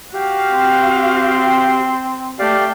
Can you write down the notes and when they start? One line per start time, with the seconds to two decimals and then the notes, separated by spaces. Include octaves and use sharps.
0.14 F#4 G4 F5
0.51 C4
2.39 A3 G4 D5 F5 G5